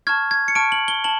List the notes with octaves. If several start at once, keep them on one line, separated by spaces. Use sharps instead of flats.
A5 C#6 F6 G#6
G#6
C#7
A5 C#6 F6 D7
F#7
G7
A5 F#7